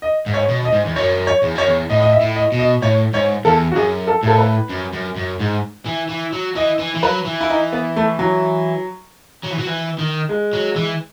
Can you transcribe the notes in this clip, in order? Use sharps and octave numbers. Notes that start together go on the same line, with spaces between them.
D#5
G#2
C#5
B2
D#5
G#2
E2
F#2 C#5
C#5
E2
F#2 C#5
E2
A2 D#5
D#5
E5
A2
D#5
B2
D#5
A2 C#5
G#2 C#5
E2 A4
F#4
F#2 G#4
A4
A2 A4
B4
F#2
F#2
F#2
G#2
E3
E3
F#3
E3 D#5
E3
E3
F#3 B4
E3
E4
D#4
B3
A3
F#3
F#3
E3
F#3
E3
D#3
G#3
F#3
E3